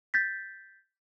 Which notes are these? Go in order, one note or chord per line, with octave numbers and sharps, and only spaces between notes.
G6 A6 B6